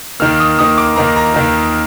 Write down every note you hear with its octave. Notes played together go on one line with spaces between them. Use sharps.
D#2 D#3 A#3 F6
D#6
D#2 D#3 A#3 D#6
D6
D#2 D#3 A#3 A#5
A#5
D#2 D#3 A#3